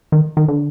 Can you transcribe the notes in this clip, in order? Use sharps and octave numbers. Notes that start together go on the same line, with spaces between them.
D#3
D#3
D3